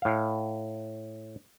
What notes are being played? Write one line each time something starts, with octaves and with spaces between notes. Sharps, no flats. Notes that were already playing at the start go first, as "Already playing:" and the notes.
A2 F5